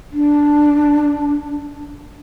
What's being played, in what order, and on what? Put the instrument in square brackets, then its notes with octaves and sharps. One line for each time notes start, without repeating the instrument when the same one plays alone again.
[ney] D4